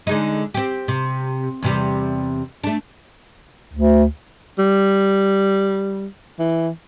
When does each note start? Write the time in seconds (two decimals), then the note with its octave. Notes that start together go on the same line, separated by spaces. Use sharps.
0.07 D3 G#3 D#4
0.54 C4 G4
0.88 C3
1.62 E2 C3 G3
2.64 A3 D4
3.73 D2
4.59 G3
6.39 E3